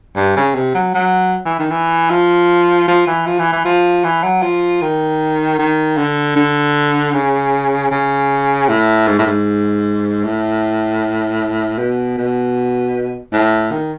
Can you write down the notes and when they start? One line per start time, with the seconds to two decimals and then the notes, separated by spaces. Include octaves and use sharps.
0.16 G2
0.36 C#3
0.55 C3
0.74 F#3
0.94 F#3
1.45 E3
1.59 D#3
1.71 E3
2.10 F3
2.88 F3
3.07 E3
3.26 F3
3.39 E3
3.52 E3
3.65 F3
4.04 E3
4.23 F#3
4.42 F3
4.82 D#3
5.59 D#3
5.97 D3
6.36 D3
7.14 C#3
7.91 C#3
8.69 A2
9.07 G#2
9.19 A2
9.27 G#2
10.24 A2
11.78 B2
12.17 B2
13.33 A2
13.72 D#3